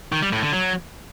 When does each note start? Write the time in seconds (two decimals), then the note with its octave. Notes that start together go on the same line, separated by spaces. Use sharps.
0.12 D#3
0.22 G3
0.32 A2
0.43 D3
0.53 F#3